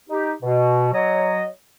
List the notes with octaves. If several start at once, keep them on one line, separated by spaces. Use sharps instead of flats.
D#4 G4
B2
F#3 C#5 D#5